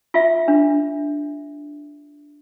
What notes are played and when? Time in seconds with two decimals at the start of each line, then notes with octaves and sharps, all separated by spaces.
0.14 F4 E5
0.48 D4